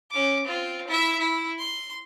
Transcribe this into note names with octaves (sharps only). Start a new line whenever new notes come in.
C#4 D6
C4 F4
E4 E5
E4
C6